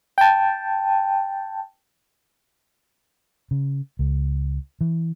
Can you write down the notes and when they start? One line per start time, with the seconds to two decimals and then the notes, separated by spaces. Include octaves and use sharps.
0.18 G5 A5
3.51 C#3
3.99 C#2
4.81 E3